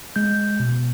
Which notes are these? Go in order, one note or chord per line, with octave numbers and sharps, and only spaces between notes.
G#3 G6
B2